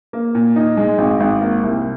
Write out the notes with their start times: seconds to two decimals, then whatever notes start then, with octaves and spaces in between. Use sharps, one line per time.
0.13 A#3
0.35 A#2
0.56 D#4
0.77 G#3
0.98 G#1
1.20 G#1
1.41 A#3
1.63 C2